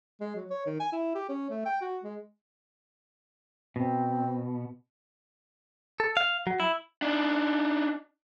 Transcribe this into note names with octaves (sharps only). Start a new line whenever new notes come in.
G#3
F#3
C#5
D#3
G#5
E4
G4
C#4
A3
G5
F#4
G#3
B2 C4
A4
F5
F#3
E4
D4 D#4